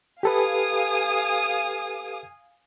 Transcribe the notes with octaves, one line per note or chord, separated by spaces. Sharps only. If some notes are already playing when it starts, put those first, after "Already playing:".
G4 A4 B4 F5 G#5 D#6